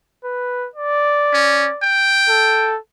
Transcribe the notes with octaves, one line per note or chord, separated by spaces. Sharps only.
B4
D5
C#4
G5
A4